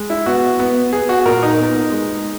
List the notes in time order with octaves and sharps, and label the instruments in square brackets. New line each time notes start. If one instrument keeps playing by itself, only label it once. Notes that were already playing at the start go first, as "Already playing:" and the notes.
Already playing: [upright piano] G#3
[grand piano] E4
[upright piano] B3 [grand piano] F#4
[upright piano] B3
[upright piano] B3 [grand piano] G#4
[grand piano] F#4
[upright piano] A#2 [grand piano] A#4
[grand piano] D#4
[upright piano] B3
G#3